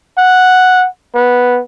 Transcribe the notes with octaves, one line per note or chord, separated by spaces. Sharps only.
F#5
B3